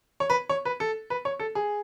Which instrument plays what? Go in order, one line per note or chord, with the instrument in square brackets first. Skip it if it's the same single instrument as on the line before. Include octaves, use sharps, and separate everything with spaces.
[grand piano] C#5
B4
C#5
B4
A4
B4
C#5
A4
G#4